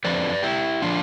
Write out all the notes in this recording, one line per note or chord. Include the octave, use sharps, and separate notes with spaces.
F2 D3 F3 B4 D5
E4 G4
D3 F3 D4 F4